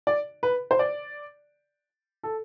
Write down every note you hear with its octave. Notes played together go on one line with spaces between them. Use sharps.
D5
B4
C5
D5
A4